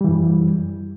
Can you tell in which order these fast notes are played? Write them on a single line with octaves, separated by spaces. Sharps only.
G3 E3 F#2